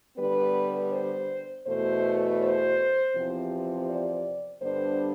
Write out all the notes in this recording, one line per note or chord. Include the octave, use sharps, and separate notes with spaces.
D3 G3 B3 B4
C5
E2 B2 A3 C5
C5
E2 C3 F3 C4
D5
G2 D3 G3 B3 D4 C5